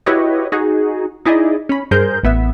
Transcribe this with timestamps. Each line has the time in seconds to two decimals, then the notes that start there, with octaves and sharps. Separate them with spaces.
0.06 E4 F#4 G4 B4 C#5 D#5
0.52 D#4 F#4 G#4
1.25 D#4 E4 G#4 D5 D#5
1.69 C#4 B5
1.91 G2 G#4 A#4 C5 G6
2.23 A1 B3 E5